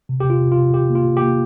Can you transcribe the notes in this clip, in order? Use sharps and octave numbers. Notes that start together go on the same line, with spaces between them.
C3
C3 G4
F4
C3
F4
C3
C3 G4
A#3
F4
C3
A#3 G4